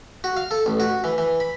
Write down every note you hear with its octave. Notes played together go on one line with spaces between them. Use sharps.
F#4
F5
A4
A1
F#4
E3
E3
B5